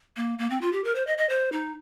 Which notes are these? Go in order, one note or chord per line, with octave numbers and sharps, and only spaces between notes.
A#3
A#3
C4
F4
G4
A#4
C5
D#5
D#5
C5
D#4